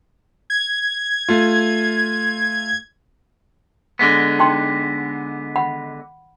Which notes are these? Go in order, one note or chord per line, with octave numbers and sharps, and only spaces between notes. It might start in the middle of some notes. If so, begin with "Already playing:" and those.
G#6
A3 F4
D3 G#3 B3
D#4 G5 C6
F#5 B5